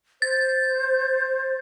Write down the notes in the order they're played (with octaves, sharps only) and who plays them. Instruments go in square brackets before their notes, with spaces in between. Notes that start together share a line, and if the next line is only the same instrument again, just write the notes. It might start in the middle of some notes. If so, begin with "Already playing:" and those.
[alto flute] C5 [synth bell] A6